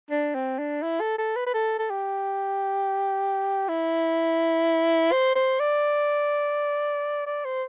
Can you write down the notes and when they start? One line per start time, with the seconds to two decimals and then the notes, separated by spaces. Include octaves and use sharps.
0.11 D4
0.35 C4
0.59 D4
0.82 E4
1.01 A4
1.18 A4
1.36 B4
1.46 B4
1.54 A4
1.79 A4
1.90 G4
3.69 E4
5.12 C5
5.36 C5
5.60 D5
7.27 D5
7.45 C5